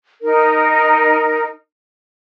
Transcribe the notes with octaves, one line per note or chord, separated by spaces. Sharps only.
D#4 A#4